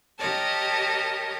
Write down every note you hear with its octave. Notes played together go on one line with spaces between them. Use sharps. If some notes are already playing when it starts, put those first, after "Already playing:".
G4 A#4 C#5 D#5 A5